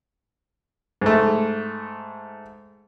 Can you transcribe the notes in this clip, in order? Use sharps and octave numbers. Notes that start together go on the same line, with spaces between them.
G#2 A3